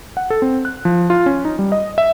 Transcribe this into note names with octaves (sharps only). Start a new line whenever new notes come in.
F#5
A4
C4
F#6
F3
F4
C#4
D#4
G3
D#5
E5